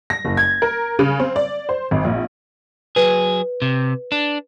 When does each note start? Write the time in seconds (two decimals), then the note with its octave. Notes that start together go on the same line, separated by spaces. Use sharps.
0.10 A#6
0.25 F#1
0.37 G#6
0.62 A#4
0.99 C#3
1.20 C4
1.36 D5
1.69 C5
1.91 G#1
2.04 A#1
2.96 F#3 G#4 B4
3.62 C3
4.12 D4